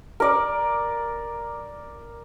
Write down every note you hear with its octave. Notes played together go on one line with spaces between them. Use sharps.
A#4 D5